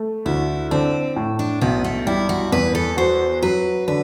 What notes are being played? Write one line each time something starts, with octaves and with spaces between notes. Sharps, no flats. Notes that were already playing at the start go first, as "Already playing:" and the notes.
Already playing: A3
D2 E4
D3 C4
A2
D4
B1 B3
A3
G3 E4
F#4
E2 B4
A4
F#4 C5
F#3 B4
D3 B4